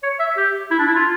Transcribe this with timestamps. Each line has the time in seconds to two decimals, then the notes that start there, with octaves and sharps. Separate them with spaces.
0.03 C#5
0.19 E5
0.37 G4
0.70 E4
0.79 D4
0.87 E4
0.96 F4